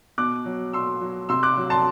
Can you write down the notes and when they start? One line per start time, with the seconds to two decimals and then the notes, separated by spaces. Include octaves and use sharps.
0.18 B2 D6 F#6
0.46 F#3
0.73 B2 C6 E6
1.01 F#3
1.29 C3 C6 E6
1.43 D6 F#6
1.57 F#3
1.70 A5 C6